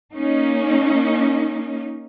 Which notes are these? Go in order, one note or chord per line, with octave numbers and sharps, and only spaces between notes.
A#3 C#4 D#4